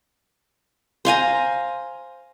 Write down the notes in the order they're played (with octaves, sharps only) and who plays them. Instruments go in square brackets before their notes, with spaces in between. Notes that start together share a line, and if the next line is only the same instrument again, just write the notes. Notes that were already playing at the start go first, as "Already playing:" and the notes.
[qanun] C5 F5 G#5 A#5